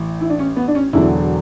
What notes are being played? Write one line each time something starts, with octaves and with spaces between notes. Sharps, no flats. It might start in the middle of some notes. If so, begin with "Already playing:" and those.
Already playing: A1 E3
E4
D4
C#4
B3
D4
C#4
E1 E2 D3 F#3 E4